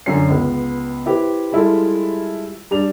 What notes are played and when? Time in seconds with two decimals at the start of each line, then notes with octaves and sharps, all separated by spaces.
0.06 F#2 D3 C#4 C#5 C7
0.29 C#2 B3
1.06 E4 G4 B4 C5
1.52 G3 G#3 E4 F4 A4
2.71 G3 D4 F7